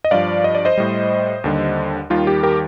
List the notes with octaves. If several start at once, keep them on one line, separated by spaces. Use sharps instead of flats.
D#5
G2 F3 D5 F5
D#5
D5
C5 D#5
A2 G3
D#2 D3 G3
D#2 D#3 G3 F4
G4
G4 A#4